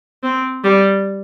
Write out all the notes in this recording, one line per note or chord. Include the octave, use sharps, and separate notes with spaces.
C4
G3